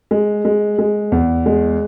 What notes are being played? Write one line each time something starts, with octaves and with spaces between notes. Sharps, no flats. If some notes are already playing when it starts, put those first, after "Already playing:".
G#3
G#3
G#3
E2
G#3